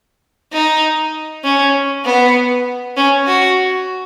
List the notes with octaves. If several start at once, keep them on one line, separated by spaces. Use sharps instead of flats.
D#4
C#4
B3
C#4
F#4